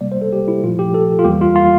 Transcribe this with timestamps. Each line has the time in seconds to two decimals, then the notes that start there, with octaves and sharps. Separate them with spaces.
0.01 C3 G3 A#3 D5
0.12 C5
0.22 A4
0.33 G4
0.48 E4
0.63 A#2 F3 A3 F4
0.79 G4
0.94 A4
1.19 F4
1.25 E2 E3 G3 A#3 G4
1.41 F4
1.56 F4